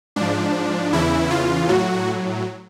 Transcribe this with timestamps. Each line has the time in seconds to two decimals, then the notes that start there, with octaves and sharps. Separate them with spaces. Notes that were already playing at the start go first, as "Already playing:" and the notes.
0.16 G#2 F3 D4
0.93 E2 C#3 E3 E4
1.30 F4
1.69 A2 F#3 F#4